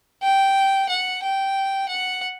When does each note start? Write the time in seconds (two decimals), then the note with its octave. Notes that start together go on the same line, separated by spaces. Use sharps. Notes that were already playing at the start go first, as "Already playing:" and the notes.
0.23 G5
0.89 F#5
1.23 G5
1.89 F#5